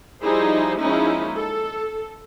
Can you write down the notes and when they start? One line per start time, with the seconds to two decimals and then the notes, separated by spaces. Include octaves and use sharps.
0.24 F3 G3 D#4 E4 G#4 C5
0.80 F3 G#3 A#3 C#4 D#4 E4
1.38 A4